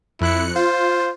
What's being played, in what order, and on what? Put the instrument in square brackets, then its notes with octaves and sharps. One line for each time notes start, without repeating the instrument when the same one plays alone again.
[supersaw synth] F2 F#6 C#7 [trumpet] E4
[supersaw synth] F4 [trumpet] C5